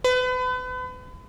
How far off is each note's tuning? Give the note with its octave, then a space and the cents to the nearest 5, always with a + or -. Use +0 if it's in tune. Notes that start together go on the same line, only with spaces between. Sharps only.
B4 +35